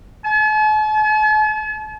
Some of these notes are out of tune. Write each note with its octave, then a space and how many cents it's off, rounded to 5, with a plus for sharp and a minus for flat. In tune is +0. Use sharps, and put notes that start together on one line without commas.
A5 -45